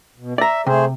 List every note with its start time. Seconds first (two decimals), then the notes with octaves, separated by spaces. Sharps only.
0.17 B2
0.38 D5 E5 A#5
0.67 C3 A3 G#4 C5